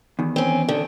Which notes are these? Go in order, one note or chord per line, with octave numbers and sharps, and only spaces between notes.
E2 D#3
C4 C#4
D3 D#3